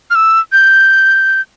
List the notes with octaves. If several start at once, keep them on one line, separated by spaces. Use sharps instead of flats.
F6
E6
G6